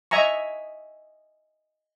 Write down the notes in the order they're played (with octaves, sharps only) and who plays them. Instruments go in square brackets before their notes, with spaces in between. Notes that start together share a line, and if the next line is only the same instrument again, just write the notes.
[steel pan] D#5 E5 G#5 A#5 C#6